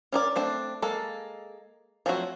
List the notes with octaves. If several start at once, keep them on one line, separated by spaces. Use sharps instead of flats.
C#4 A#4 D5
A3 C4 D4
G#3 A#3 A4
F3 F#3 A3 C4 F#4